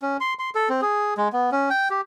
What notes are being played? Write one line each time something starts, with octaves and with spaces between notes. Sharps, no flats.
C#4
C6
C6
A4
C4
G#4
G#3
B3
C#4
G5
G4